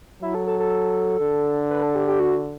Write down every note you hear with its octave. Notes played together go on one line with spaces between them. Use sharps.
F#3 E4
A4
A4
A4
D3
B4
A4
G4
G4
F#4